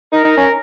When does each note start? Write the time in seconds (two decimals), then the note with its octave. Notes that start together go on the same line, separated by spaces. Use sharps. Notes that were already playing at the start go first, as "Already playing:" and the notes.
0.13 D#4 A#4
0.25 D#4
0.38 C#4